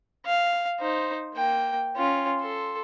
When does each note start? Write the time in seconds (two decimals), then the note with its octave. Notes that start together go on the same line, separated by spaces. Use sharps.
0.26 F5
0.80 D#4 C5
1.34 A#3 G5
1.96 C#4 F4
2.40 A4 C6